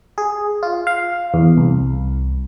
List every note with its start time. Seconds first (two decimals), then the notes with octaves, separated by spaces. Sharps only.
0.18 G#4
0.63 F4
0.87 F5
1.34 E2
1.57 C2